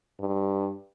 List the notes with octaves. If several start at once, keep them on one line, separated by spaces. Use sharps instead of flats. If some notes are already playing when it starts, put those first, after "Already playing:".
G2